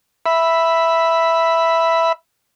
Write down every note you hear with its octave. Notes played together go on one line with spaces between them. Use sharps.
E5 B5